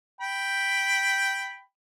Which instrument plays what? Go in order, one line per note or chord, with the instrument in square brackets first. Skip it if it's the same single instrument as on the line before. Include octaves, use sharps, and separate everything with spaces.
[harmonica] G5 B5